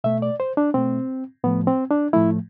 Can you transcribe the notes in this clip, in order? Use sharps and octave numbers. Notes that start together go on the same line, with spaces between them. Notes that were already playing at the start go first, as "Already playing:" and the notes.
B2 A3 E5
D5
C5
D4
B2 A3 C4
A2 F3 A3 B3
C4
D4
A2 F3 A3 E4